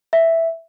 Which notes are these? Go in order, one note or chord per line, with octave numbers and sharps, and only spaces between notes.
E5